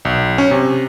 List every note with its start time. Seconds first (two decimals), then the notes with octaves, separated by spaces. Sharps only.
0.05 B1
0.38 C#4
0.51 C3